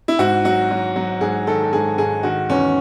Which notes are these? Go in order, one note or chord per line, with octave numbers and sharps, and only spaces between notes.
E4
G#2 F#4
F#3 F#4
F#3
F#3
G#2 G#4
D#3 A4
A4
G#2 G#4
G#2 G#4
D#3 F#4
E2 C#4